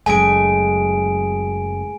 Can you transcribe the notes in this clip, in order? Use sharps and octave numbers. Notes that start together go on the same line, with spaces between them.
F#1 F#2 G#3 A3 G#4 G#5 D7